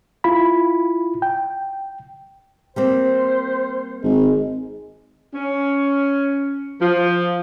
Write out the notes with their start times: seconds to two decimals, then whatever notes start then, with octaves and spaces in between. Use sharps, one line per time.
0.24 E4 F4 B5
1.22 G5
2.76 G3 A#3 C4 C5
4.03 G#1 G#3
5.35 C#4
6.81 F3